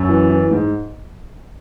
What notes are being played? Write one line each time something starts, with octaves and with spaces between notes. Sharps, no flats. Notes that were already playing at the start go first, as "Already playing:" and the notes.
Already playing: F#2
E3
E3
G#2